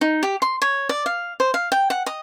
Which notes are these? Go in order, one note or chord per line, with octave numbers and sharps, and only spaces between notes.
D#4
G4
C6
C#5
D5
F5
C5
F5
G5
F#5
D#5